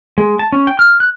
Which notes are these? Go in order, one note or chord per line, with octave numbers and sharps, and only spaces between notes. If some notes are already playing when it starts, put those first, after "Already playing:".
G#3
A5
C#4
G5
F6
F#6